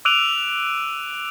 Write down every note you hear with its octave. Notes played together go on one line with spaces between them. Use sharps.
D6 E6 F#6 D7 D#7 F7